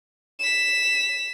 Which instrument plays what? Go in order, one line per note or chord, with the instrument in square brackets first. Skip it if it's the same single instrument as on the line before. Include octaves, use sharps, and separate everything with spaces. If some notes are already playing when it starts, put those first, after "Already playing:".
[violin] B6 E7